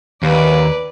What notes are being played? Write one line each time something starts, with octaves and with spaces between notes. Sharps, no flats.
D#2 B4 D5